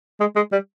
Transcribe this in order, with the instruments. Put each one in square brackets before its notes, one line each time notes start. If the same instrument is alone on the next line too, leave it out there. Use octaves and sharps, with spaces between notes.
[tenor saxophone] G#3
G#3
G3